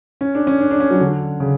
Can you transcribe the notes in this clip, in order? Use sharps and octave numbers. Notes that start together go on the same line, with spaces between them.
C#4
D4
C#4
D4
D4
C#4
F#3
D3
C#3